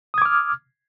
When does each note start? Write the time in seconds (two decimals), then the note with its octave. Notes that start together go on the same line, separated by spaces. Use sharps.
0.14 D#6
0.18 G#6
0.22 D6
0.25 F6